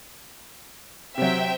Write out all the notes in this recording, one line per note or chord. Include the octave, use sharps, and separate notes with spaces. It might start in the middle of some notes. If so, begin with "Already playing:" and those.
C3 F#3 C4 E5 G5